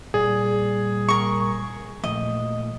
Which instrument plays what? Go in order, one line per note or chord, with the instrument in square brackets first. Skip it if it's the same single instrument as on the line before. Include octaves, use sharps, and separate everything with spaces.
[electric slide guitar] A#2 G3 D5 [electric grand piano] G#4
[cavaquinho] A#4 C#6
[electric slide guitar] A#2 F3 A3 [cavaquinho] D#5